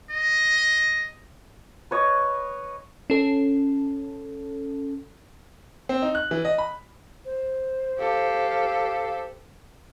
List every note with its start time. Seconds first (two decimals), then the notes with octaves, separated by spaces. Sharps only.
0.11 D#5
1.91 B4 C#5 D#5
3.10 C#4 A4
5.89 C4
6.02 D#4
6.15 F#6
6.31 E3
6.45 D#5
6.58 B5
7.25 C5
7.99 G4 A4 F5